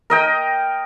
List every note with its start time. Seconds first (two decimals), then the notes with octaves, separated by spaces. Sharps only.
0.10 A#4 D#5 G5